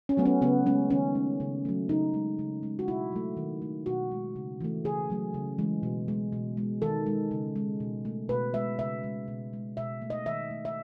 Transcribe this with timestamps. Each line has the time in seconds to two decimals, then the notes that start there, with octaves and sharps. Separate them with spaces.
0.09 C#4
0.17 F#3 A3 B3
0.26 C#4
0.42 C#3 B3
0.66 G#3 C#4
0.90 D#3 C#4
1.15 A3
1.40 C#3
1.65 F#3 A3
1.89 C#3 D#4
2.14 G#3
2.39 C#3
2.63 G#3
2.79 F#4
2.88 B2 E4
3.12 F#3 A3
3.37 D#3
3.62 A3
3.86 B2 F#4
4.12 G#3
4.36 C#3
4.61 E3 A3
4.84 C#3 G#4
5.10 F#3 A3
5.34 C#3
5.58 E3 G#3
5.83 B2
6.08 G#3
6.32 B2
6.57 G#3
6.82 D#3 A4
7.06 G#3
7.31 C#3
7.56 G#3
7.80 B2
8.05 A3
8.29 B2 B4
8.54 G#3 E5
8.79 C#3 E5
9.03 G#3
9.28 B2
9.53 G#3
9.77 B2 E5
10.02 A3
10.10 D#5
10.26 D#3 E5
10.51 A3
10.65 E5